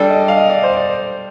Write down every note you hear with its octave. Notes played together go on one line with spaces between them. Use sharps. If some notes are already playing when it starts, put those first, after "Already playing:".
Already playing: G3 D4 A4 D5
D#5
F5
D#5
D5
C5
D5